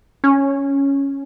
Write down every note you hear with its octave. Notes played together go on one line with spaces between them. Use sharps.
C#4